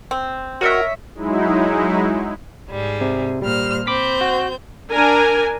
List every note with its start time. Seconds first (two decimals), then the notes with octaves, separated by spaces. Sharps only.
0.11 C4
0.61 F#4 A#4 C#5 D#5 E5
1.15 F#3 G#3 D#4 E4
2.70 G#2 G3 G#4
3.01 C3
3.42 A#2 G3 C5 F6
3.87 C4 B5 D6 G6 B6
4.21 F#4
4.90 D4 A#4 G#5